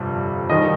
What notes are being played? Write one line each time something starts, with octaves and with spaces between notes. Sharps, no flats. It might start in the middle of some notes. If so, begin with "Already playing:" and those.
Already playing: G1 F2 C3 G3
D#2 D#3 G3 D#5